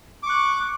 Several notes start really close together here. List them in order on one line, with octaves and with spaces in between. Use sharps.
D6 C#6 F#6